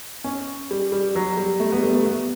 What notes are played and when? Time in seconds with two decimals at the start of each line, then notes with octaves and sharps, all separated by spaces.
0.24 C#4
0.71 G3
0.92 G3
1.16 F#3
1.37 G3
1.60 A3
1.72 B3
1.78 G3
1.83 A3
1.94 A3
2.06 B3